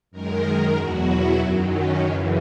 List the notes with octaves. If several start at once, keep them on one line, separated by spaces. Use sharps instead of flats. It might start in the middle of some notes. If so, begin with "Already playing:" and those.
F#2 D#3 G#3 A#4
E2 B2 F#3 F#4
E4
F#2 D#3 F#3
C#4
F#2 C#3 E3 D#4